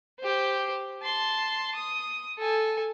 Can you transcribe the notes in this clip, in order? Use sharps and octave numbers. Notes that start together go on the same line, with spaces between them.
G4 C5
A5 C6
D#6
A4 G#5